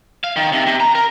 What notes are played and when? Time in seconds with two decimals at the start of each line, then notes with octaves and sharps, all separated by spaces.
0.24 F5
0.36 D#3
0.52 C3
0.67 C3
0.80 A#5
0.95 A#4